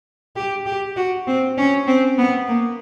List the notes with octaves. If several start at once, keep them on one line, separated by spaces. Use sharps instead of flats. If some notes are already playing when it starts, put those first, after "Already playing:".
G4
G4
F#4
C4
C#4
C4
B3
A#3